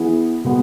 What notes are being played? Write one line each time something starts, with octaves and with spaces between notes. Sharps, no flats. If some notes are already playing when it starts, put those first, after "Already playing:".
Already playing: E3 B3 E4 G#4
B2 G#3 B3